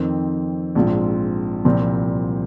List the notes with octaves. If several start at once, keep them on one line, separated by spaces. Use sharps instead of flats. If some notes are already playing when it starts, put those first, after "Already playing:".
Already playing: F2 D#3 C4
A#1 G#2 F3 C4 F4
C2 A#2 F3 C4